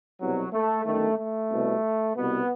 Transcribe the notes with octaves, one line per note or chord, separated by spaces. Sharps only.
C2 B2 F#3
A3
G1 F#2 D#3 A3
A3
C2 B2
C2 B2 B3